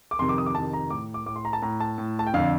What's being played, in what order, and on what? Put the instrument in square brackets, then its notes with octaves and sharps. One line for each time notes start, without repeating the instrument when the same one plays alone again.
[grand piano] D6
F2 C3 D#3 C6
D6
D#6
D6
F2 C3 D#3 A5
A#5
A2 D6
D6
A2 D6
C6
A#5
A5
A2 A#5
A5
A2
A5
G5
F2 D3 F5